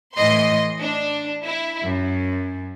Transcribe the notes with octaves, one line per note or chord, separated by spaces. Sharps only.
A2 E3 D#5 C6
D4
E4
F#2